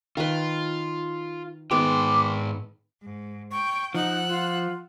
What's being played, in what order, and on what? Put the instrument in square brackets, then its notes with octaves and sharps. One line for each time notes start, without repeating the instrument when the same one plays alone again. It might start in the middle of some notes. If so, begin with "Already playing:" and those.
[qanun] D#3 B4 [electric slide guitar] F4
[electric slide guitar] G#2 E3 G5 [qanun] D#3 G#3 B3 [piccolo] D6
[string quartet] G#2
[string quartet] G5 [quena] C#6
[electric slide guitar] F3 [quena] D#4 [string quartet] F#5 E6 F#6
[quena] F4